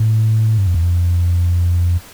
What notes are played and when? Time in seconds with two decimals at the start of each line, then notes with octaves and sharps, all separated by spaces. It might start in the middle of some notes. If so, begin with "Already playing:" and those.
Already playing: A2
0.58 G2
0.67 F2
0.74 E2
0.83 F2